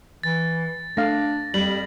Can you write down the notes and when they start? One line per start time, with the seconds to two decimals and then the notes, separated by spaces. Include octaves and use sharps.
0.23 E3 A6
0.97 A3 D4 F5 A#6
1.54 F2 G3 F#7